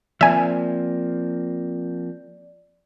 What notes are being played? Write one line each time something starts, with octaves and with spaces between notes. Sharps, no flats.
F3 A#3 C4 D5 E5 G#5